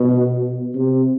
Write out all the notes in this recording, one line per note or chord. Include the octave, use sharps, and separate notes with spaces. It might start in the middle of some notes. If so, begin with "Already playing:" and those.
Already playing: B2
C3